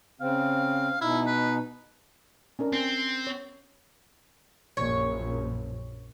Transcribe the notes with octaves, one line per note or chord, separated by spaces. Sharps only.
C#3 C4 F5
B2 D#4 E4
B4
C#4 D4 A#4
C4 G#5
C#5
A#1 F#2 C#5